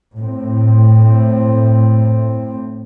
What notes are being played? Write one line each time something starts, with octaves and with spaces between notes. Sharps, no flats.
A2 C4